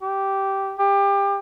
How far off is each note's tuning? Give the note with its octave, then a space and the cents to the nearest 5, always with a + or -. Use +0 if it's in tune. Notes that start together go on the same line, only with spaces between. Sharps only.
G4 -10
G4 +25